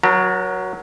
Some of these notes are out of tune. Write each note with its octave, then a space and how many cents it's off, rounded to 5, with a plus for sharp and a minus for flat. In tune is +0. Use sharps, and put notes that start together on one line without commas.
F#3 +0 A#4 +45 A#5 -45